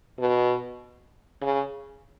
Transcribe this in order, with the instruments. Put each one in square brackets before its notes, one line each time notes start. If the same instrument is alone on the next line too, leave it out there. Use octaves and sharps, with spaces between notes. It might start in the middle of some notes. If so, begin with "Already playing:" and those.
[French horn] B2
C#3